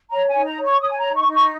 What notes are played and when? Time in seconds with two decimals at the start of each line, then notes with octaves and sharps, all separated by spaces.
0.10 C#5 A#5
0.28 G#5
0.34 D#4
0.45 A#5
0.58 C#5
0.64 C#6
0.80 C#5 D#6
0.90 G#5
0.98 A#5
1.04 D#4
1.15 C#6
1.27 D#4
1.33 C#6